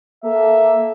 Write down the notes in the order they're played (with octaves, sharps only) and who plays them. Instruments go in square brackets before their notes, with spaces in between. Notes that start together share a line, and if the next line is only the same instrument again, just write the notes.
[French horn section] A#3 A4 [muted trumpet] E5